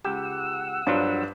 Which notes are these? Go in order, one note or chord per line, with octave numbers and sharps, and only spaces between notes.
C#2 G4 F#5 E6
G2 F3 F#3 F4